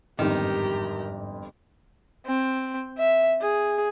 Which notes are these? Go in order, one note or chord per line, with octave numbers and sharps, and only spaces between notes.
G1 F2 G#2 D#3 G4 A#5
C4
E5
G#4